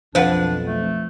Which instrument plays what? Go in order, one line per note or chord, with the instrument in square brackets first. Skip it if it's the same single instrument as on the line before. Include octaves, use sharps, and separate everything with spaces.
[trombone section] B1 F2 [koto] F3 B4 [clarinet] D4 [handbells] C5 F5 F#5
[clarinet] A3